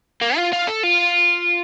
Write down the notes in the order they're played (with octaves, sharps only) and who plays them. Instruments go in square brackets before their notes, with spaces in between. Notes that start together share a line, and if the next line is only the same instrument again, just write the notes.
[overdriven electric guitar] A#3
F4
F4
A4
F4